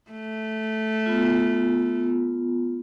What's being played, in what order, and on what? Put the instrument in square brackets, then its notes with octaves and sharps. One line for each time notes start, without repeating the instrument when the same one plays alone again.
[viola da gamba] A3
[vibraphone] B3 F4